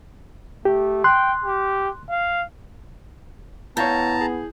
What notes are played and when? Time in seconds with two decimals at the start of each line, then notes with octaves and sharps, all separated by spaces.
0.65 A3 G4
1.04 G5 C6 F#6
1.44 G4
2.10 F5
3.77 A2 B3 C#5 F5 A5 A#5 G6
4.21 G#4